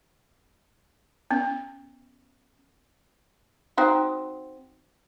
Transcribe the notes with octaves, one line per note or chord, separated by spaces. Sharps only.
B3 C#4
C4 D#4 F#4